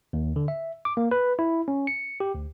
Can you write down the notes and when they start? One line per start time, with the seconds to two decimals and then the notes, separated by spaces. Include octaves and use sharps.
0.13 D#2
0.36 D3
0.48 E5
0.85 D6
0.97 A#3
1.11 B4
1.39 E4
1.68 C#4
1.87 C#7
2.20 G4
2.35 D2